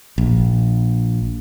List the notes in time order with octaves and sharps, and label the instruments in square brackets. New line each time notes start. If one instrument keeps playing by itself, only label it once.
[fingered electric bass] A#1